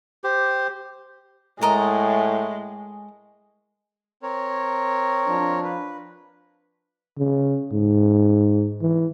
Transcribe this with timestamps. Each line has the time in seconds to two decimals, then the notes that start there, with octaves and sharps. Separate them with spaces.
0.24 G4 C5
1.62 A2 G#3 A4 A#4 D#5
4.23 C4 A#4 C#5
5.27 F3 D4
5.63 B4
7.18 C#3
7.73 G#2
8.82 E3